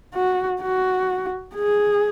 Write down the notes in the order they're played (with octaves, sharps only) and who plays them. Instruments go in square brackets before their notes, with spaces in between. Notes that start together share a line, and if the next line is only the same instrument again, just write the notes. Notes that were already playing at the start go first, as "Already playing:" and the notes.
[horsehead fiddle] F#4
F#4
G#4